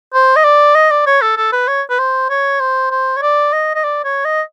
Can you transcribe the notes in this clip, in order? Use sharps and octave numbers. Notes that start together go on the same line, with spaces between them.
C5
D#5
D5
D#5
D5
C#5
A4
A4
B4
C#5
B4
C5
C#5
C5
C5
C#5
D5
D#5
D#5
D5
C#5
D#5